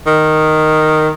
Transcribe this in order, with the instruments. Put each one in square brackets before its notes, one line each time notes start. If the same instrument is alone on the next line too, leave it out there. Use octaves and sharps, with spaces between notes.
[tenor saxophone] D#3